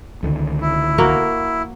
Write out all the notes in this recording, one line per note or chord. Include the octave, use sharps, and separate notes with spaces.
C#2 D3 D#3
E4
A#3 F#4 A#4